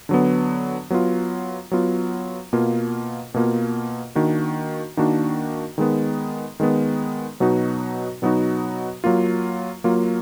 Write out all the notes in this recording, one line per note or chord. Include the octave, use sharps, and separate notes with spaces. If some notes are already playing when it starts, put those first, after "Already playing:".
D3 F#3 B3
F#3 B3 F4
F#3 B3 F4
B2 A#3 F4
B2 A#3 F4
D#3 A#3 D4 F#4
D#3 A#3 D4 F#4
D#3 G#3 B3
D#3 G#3 B3
B2 F#3 B3 D#4 F#4
B2 F#3 B3 D#4 F#4
F#3 A#3 F4
F#3 A#3 F4